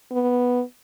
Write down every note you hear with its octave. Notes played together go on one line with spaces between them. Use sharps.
B3